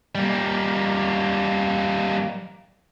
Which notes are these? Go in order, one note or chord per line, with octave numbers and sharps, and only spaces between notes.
G3 A#3